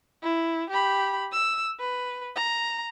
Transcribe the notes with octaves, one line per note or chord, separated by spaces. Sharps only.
E4
G4 B5
E6
B4
A#5